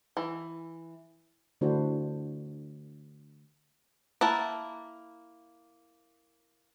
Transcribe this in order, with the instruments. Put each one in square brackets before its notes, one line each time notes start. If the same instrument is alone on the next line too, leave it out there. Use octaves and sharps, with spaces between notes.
[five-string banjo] E3
[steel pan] D3 A3 D4 E4 F#4 C5
[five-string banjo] A#3 E4 F#5 A5